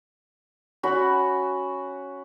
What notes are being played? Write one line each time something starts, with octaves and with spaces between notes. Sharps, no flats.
C#4 F#4 B5